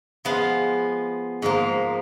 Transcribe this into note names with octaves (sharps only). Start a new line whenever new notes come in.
F3 G#3 B3 F4
G#2 F3 A#3